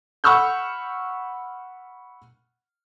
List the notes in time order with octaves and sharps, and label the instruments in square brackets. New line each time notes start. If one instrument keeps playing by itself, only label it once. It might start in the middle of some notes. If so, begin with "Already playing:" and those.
[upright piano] F#5 B5 C#6 E6 F6 G6